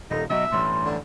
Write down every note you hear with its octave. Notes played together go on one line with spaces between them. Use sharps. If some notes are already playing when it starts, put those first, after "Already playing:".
D#1 D#4 A4
B2 F#3 D#5 E5
A1 G2 C6
D3